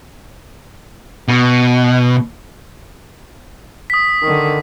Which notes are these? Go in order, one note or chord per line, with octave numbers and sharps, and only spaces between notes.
B2
D#6 B6
D3 D#3